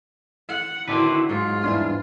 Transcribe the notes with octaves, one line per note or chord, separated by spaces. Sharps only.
F#5
D3 D#3 C4 D4 E4 F#4 B4
G#2 F#3 G#3 F4
E2 G2 D4 E4